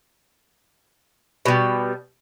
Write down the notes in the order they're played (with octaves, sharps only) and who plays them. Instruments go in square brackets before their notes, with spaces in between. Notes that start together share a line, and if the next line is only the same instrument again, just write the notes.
[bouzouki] B2 G3